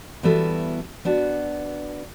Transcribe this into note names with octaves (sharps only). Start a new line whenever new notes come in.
E3 G3 B3 E4 F#4 A4
B3 D4 F#4